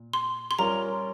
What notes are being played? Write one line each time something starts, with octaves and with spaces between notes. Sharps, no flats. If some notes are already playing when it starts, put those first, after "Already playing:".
Already playing: A#2
C6
C6
G3 C#4 F4 A#4 A#5